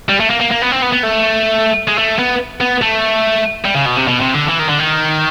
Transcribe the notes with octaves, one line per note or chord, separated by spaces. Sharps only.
G3
A3
A#3
A#3
A#3
B3
C4
B3
B3
A3
G#3
A3
B3
B3
A3
G3
C#3
B2
C3
B2
C3
D3
E3
D#3
D3
D#3